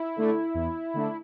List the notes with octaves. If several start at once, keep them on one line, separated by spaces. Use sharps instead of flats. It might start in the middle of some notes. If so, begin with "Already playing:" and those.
Already playing: E4
D3 A3 D4
E2
D3 A3 D4